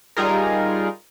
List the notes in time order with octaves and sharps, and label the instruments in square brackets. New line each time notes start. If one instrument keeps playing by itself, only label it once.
[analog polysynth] G3 D#4 F4 G#4 A#4